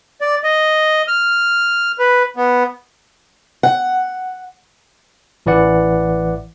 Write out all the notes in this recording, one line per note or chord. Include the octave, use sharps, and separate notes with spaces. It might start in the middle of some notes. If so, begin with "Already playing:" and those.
D5
D#5
F6
B4
B3
F#5
A1 E3 E4 D5 F#5